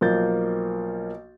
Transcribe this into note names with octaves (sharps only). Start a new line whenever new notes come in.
B1 F3 A#3 G6 A6